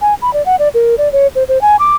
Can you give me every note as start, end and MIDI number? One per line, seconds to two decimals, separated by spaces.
0.01 0.14 80
0.22 0.33 83
0.33 0.45 74
0.46 0.56 78
0.59 0.69 74
0.74 0.95 70
0.98 1.11 74
1.12 1.27 73
1.35 1.43 72
1.49 1.61 72
1.61 1.76 80
1.79 1.96 86